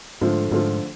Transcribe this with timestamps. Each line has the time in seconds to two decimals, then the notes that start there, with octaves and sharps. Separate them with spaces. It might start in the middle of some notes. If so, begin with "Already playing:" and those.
0.21 G#2 D3 F3 A3 F4
0.51 G#2 D3 F3 A3 F4